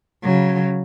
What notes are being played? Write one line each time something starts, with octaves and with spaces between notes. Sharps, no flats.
C#3 F#3